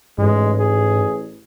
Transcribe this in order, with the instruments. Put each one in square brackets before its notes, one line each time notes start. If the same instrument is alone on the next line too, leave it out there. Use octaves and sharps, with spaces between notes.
[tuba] A1 [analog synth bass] G#2 [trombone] G#3
[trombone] G#4